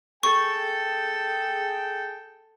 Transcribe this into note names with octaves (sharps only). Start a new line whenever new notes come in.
G#4 A4 G5 C#6